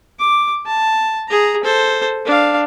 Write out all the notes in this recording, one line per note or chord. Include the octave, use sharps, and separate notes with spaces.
D6
A5
G#4 A#5
A4 C5
D4 F5